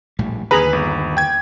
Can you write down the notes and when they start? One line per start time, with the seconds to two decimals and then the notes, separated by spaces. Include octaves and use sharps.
0.19 A#1 A2 G3
0.51 D#2 D3 G#4 B4 A#5 B5
0.73 G1
1.17 G5 G#6